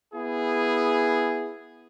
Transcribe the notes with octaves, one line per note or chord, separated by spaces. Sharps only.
B3 E4 G#4